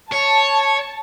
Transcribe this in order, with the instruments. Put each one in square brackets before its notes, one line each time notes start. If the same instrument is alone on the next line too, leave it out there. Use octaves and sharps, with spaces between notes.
[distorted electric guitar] C#5 [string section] A5